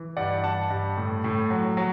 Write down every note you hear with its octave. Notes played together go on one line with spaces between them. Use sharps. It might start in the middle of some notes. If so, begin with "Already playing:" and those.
Already playing: E3
G2 D5 F#5
G2 F#5 A5
G2
A2
A2
F#3
F#3